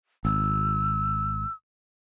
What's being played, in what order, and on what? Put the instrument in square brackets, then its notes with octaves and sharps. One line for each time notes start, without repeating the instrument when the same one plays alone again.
[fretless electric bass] G#1 [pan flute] E6